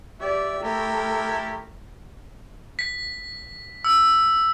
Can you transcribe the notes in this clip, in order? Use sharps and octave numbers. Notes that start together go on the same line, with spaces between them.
G4 D5 E5
A3 E4 G4 A4 A#4
B6
E6